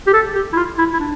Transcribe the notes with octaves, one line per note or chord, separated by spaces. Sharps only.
G4
A4
G4
E4
F4
E4
E4
D4